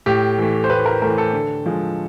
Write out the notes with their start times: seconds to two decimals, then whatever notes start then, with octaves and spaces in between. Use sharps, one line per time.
0.06 A2 G4
0.38 E3 A3
0.64 C5
0.70 A2 B4
0.86 A#4
1.02 E3 A3 A#4
1.18 A4
1.33 D3
1.66 F3 G#3